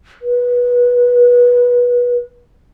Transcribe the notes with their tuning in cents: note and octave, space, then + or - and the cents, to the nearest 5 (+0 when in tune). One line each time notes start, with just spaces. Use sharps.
B4 -20